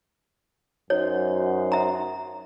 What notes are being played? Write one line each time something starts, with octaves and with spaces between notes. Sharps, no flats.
F#2 D#4 F#4 C5 C#5
E5 A#5